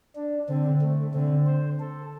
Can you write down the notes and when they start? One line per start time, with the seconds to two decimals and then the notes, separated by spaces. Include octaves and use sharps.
0.16 D4
0.48 D3 C4
0.81 A3
1.14 D3 C4
1.47 C5
1.80 A4